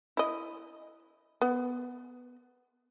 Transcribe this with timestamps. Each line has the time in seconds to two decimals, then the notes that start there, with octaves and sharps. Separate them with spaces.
0.17 E4 D#5
1.41 B3